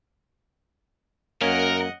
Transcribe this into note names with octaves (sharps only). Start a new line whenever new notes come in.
F#2 A#3 C#4 A#4 D#5 F#5